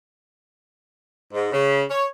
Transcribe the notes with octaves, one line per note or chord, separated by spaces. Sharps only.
G#2
C#3
C#5